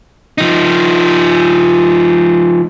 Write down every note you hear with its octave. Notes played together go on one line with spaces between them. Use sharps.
F3 D#4